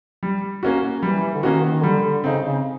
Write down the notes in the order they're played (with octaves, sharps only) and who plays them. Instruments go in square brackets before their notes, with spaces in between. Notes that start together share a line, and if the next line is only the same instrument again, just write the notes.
[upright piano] G3
A#3 C#4 F#4
[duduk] E3 [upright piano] G3
[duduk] D3
[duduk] D#3 [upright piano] A#3 C#4 F#4
[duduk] D#3
[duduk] D3 [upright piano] G3
[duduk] D3
[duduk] C#3 [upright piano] C4 D#4
[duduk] C#3